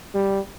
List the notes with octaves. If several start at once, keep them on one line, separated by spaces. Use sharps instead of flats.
G3